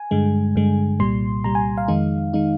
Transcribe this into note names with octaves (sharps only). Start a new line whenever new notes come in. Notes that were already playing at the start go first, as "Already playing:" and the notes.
Already playing: G#5
G2 D3 G#3
G2 D3 G#3
C2 A#2 G3 C6
C2 A#2 G3 A#5
G#5
F5
F2 D#3 G#3 D#4
D#3 G#3 D#4